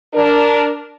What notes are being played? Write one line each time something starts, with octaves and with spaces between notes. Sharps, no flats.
D4 A#4